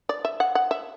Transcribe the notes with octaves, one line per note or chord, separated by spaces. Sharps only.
D5
E5
F#5
F#5
E5